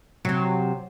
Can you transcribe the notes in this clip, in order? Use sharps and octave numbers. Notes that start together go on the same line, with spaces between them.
C3 F#3 C4